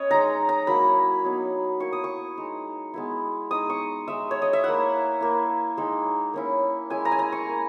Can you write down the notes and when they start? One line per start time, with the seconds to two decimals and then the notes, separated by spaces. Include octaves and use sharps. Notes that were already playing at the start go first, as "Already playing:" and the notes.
Already playing: C#4 C#5 D#5
0.11 G#3 D#4 A#5
0.49 A#5
0.67 F#3 A#3 E4 B5
1.24 F#3 B3 D#4
1.80 A#3 E4 C#6
1.93 D#6
2.04 C#6
2.37 G#3 D#4
2.94 G#3 B3 E4
3.50 G#3 D#4 D#6
3.70 C#6
4.08 G#3 D#4 E5
4.31 C#5
4.42 D#5
4.53 E5
4.64 A#3 E4 F#5
5.21 A#3 E4
5.77 G#3 D#4
6.34 A#3 C#4 E4
6.90 G#3 C#4 E4 G#5
7.05 A#5
7.12 G#5
7.19 A#5
7.32 C#6
7.47 A#3 E4